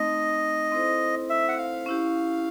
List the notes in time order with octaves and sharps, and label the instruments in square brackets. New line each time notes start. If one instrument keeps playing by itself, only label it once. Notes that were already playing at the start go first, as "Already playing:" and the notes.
Already playing: [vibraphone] A3 C4 D#4 [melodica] D#5
[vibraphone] C4 E4 A4 C5
[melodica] E5
F#5
F5
[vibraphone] C#4 E4 G4